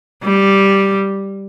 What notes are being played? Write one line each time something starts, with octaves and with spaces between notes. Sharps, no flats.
G3